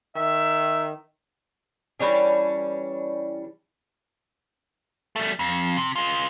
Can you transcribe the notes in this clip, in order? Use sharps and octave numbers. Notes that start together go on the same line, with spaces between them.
D#3 E5
E3 G3 C#4 D4
G3 A3
F2
C3
G#3 F4